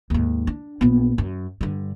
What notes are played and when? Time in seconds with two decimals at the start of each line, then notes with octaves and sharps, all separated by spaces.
0.10 D#2 G#2
0.47 D4
0.81 A#1 B3
1.18 F#2
1.61 G2 D3